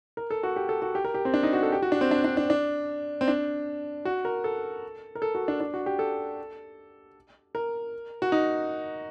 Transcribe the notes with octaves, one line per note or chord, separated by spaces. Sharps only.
A#4
A4
F#4
G4
A4
F#4
G4
A#4
G4
C4
D4
D#4
F#4
A4
G4
F#4
D4
C4
D4
D4
D4
D4
C4
D4
F#4
A#4
A4
A#4
A4
F#4
D4
D4
F#4
G4
A4
A#4
F#4
D#4